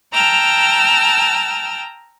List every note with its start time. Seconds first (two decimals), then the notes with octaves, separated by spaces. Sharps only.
0.14 G5 A5 A#5 E6 F6